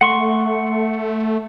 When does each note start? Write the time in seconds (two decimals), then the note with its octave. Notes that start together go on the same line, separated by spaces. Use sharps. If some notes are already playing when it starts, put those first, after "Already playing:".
0.01 A3 F#5 C6 C#6